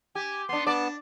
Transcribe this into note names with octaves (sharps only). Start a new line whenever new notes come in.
G4 G#5
B3 D4 C6
B3 D4 D5 A5